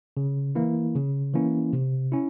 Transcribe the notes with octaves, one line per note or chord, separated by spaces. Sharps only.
C#3
E3 A#3 E4
C#3
E3 A#3 C#4 E4
C3
C#4 E4